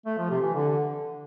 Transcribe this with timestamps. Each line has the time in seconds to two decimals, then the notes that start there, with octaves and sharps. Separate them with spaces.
0.06 A3
0.18 F3
0.30 C3
0.42 E3
0.54 D3